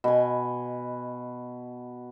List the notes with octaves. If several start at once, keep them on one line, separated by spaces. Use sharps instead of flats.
B2 G#5